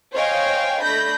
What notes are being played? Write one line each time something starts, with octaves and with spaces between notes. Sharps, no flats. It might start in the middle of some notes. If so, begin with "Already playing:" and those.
C5 C#5 D#5 F5 G5 G#5
A3 D4 B5 G6 A#6